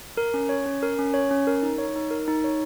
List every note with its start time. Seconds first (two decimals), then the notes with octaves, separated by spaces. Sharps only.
0.17 A#4
0.34 C#4
0.49 C#5
0.66 C#4
0.83 A#4
0.99 C#4
1.14 C#5
1.31 C#4
1.47 A#4
1.63 D#4
1.78 C#5
1.96 D#4
2.11 A#4
2.28 D#4
2.44 C#5